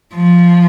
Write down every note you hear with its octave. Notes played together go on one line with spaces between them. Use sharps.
F3